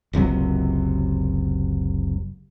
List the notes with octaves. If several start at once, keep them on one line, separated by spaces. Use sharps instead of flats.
F#1 C#2 C3 F#3